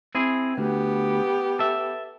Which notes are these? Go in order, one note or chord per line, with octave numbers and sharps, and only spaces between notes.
C4 E4 G#4
D2 B3 G4
A4 E5